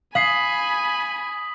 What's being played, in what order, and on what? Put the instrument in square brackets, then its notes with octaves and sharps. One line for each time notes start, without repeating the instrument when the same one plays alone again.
[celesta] F5 C7 [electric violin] G#5 B5 [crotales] D#6 B6 F#7